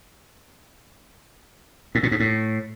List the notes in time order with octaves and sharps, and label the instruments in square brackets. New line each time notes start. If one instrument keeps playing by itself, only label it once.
[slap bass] A2
A#2
G#2
A2